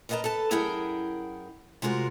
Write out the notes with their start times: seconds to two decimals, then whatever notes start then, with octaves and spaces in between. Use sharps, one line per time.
0.09 A#4 B4 D#5 F5 A5 A#5
0.24 A4 B4 A5
0.51 F#2 E4 G#4 A#4 F#5 G5
1.82 C3 G#3 F4 F#4 A#4